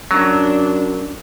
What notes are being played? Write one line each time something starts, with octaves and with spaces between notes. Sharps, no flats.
F#2 F#3 D4